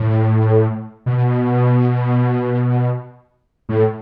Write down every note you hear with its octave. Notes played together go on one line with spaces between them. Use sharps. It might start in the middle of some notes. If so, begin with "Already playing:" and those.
Already playing: A2
B2
A2